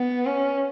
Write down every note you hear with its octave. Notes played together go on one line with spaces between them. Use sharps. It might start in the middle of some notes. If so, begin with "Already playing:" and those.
Already playing: B3
C#4